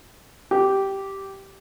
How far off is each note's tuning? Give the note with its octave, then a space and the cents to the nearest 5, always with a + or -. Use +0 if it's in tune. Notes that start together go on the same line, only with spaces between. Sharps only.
G4 -10